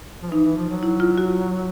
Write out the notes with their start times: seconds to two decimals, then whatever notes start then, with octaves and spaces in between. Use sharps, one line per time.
0.23 F3
0.31 E3 D#4
0.44 E3
0.56 F3
0.69 F#3
0.83 E4
1.00 F4
1.18 F#4